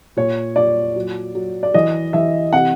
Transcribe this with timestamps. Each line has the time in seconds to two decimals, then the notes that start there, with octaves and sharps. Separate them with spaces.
0.17 A#2 C#5
0.56 A#2 D5
0.96 F#3
1.35 F#3
1.63 D5
1.74 E3 D#5
2.13 E3 E5
2.53 C3 F#5